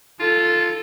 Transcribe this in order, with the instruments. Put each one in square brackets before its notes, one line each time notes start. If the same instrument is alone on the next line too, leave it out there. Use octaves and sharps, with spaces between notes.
[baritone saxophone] F4 [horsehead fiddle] A4